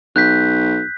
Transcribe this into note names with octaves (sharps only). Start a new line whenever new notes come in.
B1 F#6 G6 B6